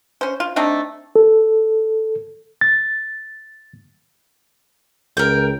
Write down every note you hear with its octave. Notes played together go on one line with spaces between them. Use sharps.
C#4 C5
F4
A3 C4 D4 D#4
A4
A6
C#2 A#4 G5